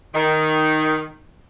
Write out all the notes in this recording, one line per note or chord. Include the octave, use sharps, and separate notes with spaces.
D#3